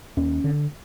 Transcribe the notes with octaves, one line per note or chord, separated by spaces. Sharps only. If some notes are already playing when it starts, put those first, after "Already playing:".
D#2 C#4
D3